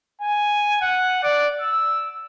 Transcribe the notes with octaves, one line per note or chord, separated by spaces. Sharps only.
G#5
F#5
D5
E6